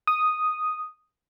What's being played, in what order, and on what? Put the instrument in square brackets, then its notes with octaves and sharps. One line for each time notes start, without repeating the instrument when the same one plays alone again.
[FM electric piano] D#6